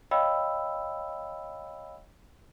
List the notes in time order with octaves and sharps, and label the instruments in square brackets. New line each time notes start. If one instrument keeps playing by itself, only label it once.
[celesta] C#5 D#5 F5 G5 B5 E6